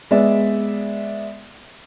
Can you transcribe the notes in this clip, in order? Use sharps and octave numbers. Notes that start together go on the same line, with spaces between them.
G#3 B3 D5 E5